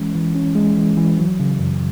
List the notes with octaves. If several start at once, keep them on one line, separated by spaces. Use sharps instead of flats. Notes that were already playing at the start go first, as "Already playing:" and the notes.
Already playing: E3 G#3 C#4
E3
C#4
G#3
E3
E3
F#3
C#3
F#2